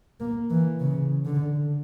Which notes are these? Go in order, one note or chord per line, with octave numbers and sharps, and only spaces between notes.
A#3
E3
C#3
D3